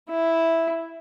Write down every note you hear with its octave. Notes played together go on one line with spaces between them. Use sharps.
E4